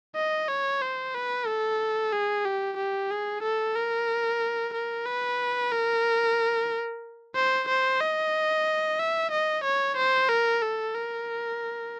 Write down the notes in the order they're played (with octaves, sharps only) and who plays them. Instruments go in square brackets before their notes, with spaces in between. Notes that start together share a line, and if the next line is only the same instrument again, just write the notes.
[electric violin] D#5
C#5
C5
B4
A4
G#4
G4
G4
G#4
A4
A#4
A#4
B4
A#4
C5
C5
D#5
E5
D#5
C#5
C5
A#4
A4
A#4